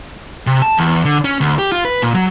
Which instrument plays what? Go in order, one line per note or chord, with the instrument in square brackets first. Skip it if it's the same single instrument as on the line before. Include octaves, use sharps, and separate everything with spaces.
[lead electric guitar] C3
A5
E2
D3
C#4
D2
G4
F4
B4
A#2
F#3